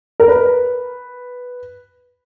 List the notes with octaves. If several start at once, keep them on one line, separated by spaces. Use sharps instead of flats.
A#4
B4